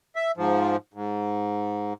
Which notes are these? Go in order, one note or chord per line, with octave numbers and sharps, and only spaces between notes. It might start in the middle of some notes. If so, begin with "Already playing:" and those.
E5
G#2 F3
G#2